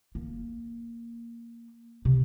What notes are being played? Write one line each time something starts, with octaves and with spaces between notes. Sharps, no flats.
A#3
C3